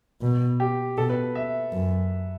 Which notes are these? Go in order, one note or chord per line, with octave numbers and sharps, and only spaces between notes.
B2
G4
B2 A4
B4
E5
F#2